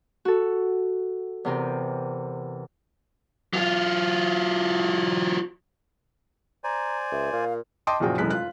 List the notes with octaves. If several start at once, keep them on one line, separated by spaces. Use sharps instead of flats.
F#4 A4
E2 C3 A#4 G5
F#3 F4
C5 D5 G#5 A#5
C#2 E5
A#2 F5
D#5 G5 A5 C6 D6 D#6
F#1 A#2 F3 F#4 G#4 G5
F1 F#2 E3 G#3 F#6 B6
F4 F#6